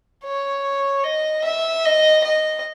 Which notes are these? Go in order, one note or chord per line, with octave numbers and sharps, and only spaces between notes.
C#5
D#5
E5
D#5
D#5